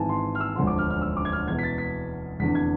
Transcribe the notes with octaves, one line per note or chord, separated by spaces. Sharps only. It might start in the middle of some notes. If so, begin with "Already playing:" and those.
Already playing: G#1 G#2 E3 G#5 A5
C6
F6
E6
E1 D2 D3 F3 C6
D6
F6
F6
E6
D6
G#6
F6
E2 B2 G#6
B6
A6
B6
F1 E2 D3 B6
G#6